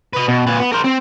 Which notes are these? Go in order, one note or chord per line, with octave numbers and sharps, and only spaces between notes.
B4 D#5
B2
A#2 B4
B3
A#4 C5
C4